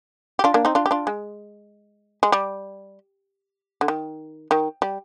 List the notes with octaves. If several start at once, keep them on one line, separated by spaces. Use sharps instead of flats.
G4
D4 F4
A#3 D4
C4 D#4
D4 F4
G4
D4 F4
G#3
G#3
G3
D3
D#3
D#3
G3